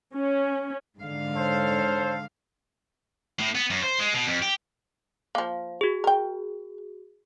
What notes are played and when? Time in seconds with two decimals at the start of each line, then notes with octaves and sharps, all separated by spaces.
0.15 C#4
0.99 G#2 D3 F5
1.34 A4 C5 C#5
3.39 A2
3.55 B3
3.70 F#2
3.83 C5
4.00 G#3
4.14 B2
4.27 F2
4.42 G4
5.35 F3 A#3 F5
5.81 F#4 G#4
6.04 A#4 G5